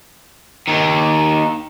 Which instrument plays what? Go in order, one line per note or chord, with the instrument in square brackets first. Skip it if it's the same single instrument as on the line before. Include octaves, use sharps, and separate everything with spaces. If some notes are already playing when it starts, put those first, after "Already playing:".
[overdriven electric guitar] D#2 D#3